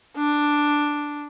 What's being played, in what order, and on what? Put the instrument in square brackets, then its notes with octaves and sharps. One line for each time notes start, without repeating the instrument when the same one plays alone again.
[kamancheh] D4